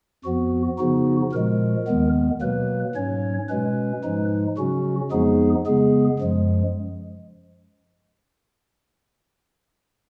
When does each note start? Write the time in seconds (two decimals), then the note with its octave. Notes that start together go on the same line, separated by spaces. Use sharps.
0.24 F2 F3 B3 F#4
0.78 C#3 F3 B3 D#4 F#4
1.32 A#2 F3 G#3 A#4
1.87 D#2 D#3 G#3 B3
2.41 B2 F#3 A#3 B4
2.95 G#2 F#3 C#4 C#5
3.49 B2 G#3 C#4 B4
4.04 G#2 F3 G#3 D#4
4.58 C#3 F#3 C#4 F#4
5.11 F2 F3 G#3 B3 D#4 G#4
5.66 C#3 G#3 B3 G#4
6.20 F#2 F3 G#3